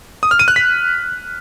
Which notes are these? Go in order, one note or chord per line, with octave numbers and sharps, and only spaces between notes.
D#6
F6
D#7
F#6
B6